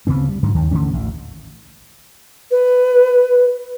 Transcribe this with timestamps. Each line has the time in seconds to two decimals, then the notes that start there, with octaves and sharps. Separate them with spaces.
0.07 D2 C#3 B3 C4
0.29 G3
0.43 G#2 D3 F#3
0.55 D#2 D#3
0.71 D3 E3 A3 C#4
0.93 A1 D2
2.51 B4